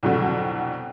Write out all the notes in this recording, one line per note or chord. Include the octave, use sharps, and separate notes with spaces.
C2 F2 B2 D3 F#3